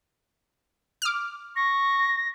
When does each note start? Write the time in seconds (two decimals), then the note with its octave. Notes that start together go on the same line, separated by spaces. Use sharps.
1.02 D6 F6
1.56 C#6 A#6